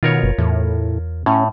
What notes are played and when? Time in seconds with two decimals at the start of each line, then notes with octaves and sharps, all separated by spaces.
0.03 B2 D#3 F4 A#4 C#5
0.23 F#1
0.38 E2 A2
1.26 A2 C#4